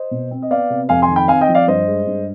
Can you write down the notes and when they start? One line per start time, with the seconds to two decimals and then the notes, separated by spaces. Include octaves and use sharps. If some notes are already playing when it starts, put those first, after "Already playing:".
Already playing: C5 D#5
0.11 B2
0.31 C4
0.42 D#5
0.51 B3 D5 F5
0.70 C3
0.89 F2 F5 G#5
1.02 G#5 C6
1.09 D#3
1.16 G5 B5
1.28 C4 F5 G#5
1.41 D#5 G5
1.48 F3
1.55 D5 F5
1.67 G2 C5 D#5
1.87 G#3
2.07 G2